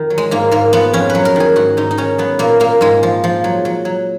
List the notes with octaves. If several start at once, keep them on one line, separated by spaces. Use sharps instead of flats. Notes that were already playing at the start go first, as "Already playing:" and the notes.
Already playing: F2 D#3
F#3
G#3
G#2 A#3
G#2 A#3
F3 B3
F2 C#4
B4
F#3
A#4
D#3 G#4
G#2 F#4
G#2 D#4
D#4
D#3 C#4
F#3 B3
A#2 A#3
A#2 A#3
G#2 G#3
F3
F3
F#3
F#3
F#3